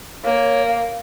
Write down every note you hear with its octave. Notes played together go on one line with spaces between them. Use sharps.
A#3 C#5
F5